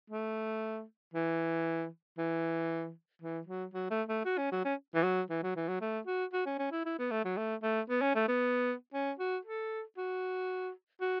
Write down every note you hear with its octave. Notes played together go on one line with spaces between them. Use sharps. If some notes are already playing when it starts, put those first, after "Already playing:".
A3
E3
E3
E3
F#3
F#3
A3
A3
F#4
C#4
F#3
C#4
E3
F#3
E3
F#3
E3
F#3
A3
F#4
F#4
C#4
C#4
E4
E4
B3
A3
F#3
A3
A3
B3
C#4
A3
B3
C#4
F#4
A4
F#4
F#4